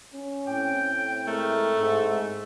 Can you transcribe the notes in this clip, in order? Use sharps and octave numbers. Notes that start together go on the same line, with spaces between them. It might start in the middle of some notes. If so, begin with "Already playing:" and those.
C#4
A2 C4 G5
G#3 A3 A#4
G#2 E5